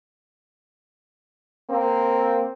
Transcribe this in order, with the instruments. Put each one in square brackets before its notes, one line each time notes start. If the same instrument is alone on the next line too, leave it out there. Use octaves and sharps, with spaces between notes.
[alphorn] A#3 [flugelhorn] C4